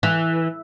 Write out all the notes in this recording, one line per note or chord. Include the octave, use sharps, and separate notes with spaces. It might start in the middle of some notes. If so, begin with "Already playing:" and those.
E3